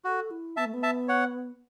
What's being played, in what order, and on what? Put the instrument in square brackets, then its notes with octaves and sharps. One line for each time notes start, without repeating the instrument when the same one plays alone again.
[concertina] F#4 [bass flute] A4
[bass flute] E4
[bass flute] B3 [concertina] E5 A5
[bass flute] A3
B3
[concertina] E5 A5
C#5 F#5